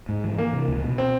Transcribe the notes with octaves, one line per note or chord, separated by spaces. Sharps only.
G#2
E3
E3 A#3
C3
C#2
B2
C4